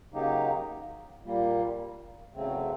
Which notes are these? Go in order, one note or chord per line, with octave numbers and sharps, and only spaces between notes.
C#3 F#3 A#3 D#4 G4
A#2 G3 A#3
E2 C#3 F#3 A3 C4